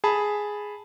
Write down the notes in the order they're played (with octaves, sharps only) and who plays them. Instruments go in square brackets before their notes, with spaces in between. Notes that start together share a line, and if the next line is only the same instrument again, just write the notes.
[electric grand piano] G#4 A5 B5